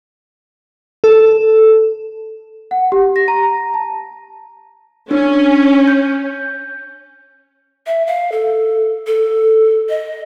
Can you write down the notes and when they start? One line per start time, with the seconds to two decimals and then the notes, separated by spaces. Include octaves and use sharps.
1.04 A4
2.71 F#5
2.92 G4
3.16 A#6
3.28 A#5
3.74 A5
5.11 C#4 D4
5.88 G6
7.87 E5
8.07 F5
8.32 A4
9.07 A4
9.89 D#5